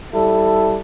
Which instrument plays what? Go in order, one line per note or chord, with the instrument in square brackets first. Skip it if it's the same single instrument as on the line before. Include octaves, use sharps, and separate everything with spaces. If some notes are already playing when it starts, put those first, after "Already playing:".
[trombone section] G3 E4 A4